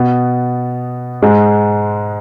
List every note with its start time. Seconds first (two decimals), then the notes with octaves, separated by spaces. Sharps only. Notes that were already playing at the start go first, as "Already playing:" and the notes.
Already playing: B2 B3
1.22 G#2 G#3